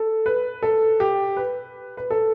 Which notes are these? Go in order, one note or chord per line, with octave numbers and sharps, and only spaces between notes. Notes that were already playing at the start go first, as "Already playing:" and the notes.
Already playing: A4
B4
A4
G4
B4
B4
A4